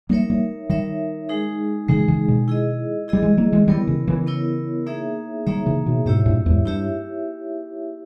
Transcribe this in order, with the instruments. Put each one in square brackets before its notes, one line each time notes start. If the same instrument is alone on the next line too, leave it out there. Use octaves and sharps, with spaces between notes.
[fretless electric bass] G3 A#3 [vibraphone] D#4 A#4 C#5 E5
[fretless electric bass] G3 A#3
[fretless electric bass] D#3 G3 [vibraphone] D#4 A#4 C#5 E5
[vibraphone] G#3 D#4 G#4
[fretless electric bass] C#3 E3 [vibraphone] G#3 D#4 G#4
[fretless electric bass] C#3 E3
B2 D#3
[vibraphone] E4 G#4 D#5
[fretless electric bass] G3 [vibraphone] E4 G#4 D#5
[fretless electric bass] E3 G#3
G3 A#3
E3 G#3
[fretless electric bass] D#3 G3 [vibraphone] B3 E4 A#4 C#5
[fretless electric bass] C#3 E3
C#3 E3
[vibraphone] B3 E4 A#4 C#5
A#3 D#4 G#4 C#5 E5
[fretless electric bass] D#3 G3 [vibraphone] A#3 D#4 G#4 C#5 E5
[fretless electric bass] C#3 E3
B2 D#3
[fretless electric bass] G#2 B2 [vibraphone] E4 G4 C#5 E5
[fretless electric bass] G2 A#2
E2 G#2
[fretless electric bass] G2 [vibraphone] E4 G4 C#5 E5